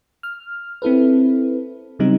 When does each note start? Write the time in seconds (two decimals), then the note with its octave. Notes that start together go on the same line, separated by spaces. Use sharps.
0.23 F6
0.82 C4 E4 A4 B4
1.99 C#3 F#3 G3 C4 D#4